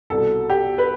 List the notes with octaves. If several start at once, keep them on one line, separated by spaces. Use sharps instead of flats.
C2 B2 A4
G4
B4